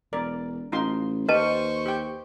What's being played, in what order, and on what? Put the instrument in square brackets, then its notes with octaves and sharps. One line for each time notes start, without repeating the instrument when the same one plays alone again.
[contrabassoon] E1 [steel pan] A#4 D5
[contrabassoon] A1 [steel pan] D#4 F4 C6
[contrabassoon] D#2 [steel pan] G4 [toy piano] B4 D#5 A5 [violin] C5 C#6
[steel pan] G4 G5